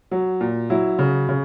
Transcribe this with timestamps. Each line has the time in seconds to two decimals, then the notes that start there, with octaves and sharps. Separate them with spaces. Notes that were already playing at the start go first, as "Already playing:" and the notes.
0.11 F#3
0.41 A#2
0.70 F#3 E4
0.99 C#3
1.29 C#3